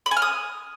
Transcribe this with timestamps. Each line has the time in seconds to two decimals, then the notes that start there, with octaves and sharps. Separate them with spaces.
0.06 B5
0.11 G#5
0.17 F6
0.22 D#6